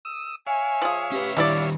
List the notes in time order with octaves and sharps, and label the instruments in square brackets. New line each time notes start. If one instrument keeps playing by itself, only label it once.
[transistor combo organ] D#6 E6
[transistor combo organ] C#5 E5 F5 [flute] G#5
[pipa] F3 G#4
[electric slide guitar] C#4 B4 [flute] G4
[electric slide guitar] D#3 G3 [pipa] D4 E4 D5 [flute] G4